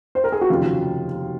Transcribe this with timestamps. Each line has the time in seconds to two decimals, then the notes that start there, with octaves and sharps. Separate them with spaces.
0.15 C5
0.24 A#4
0.32 G#4
0.41 F#4
0.49 F1 D#2 C#3 F#3 F4